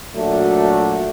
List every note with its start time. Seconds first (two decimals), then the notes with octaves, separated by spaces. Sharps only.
0.15 A#2 F#3 A3 D4 F#4